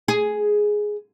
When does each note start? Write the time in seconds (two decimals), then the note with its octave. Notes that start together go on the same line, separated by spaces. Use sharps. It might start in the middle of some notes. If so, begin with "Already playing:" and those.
0.08 G#4